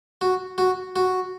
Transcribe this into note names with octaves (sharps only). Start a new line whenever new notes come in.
F#4
F#4
F#4